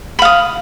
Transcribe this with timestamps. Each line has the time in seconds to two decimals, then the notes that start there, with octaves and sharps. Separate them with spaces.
0.19 B5
0.22 F5
0.25 D#6